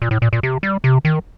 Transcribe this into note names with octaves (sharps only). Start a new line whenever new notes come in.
A#2
A2
A#2
A#2
C3
G3
C3
D#3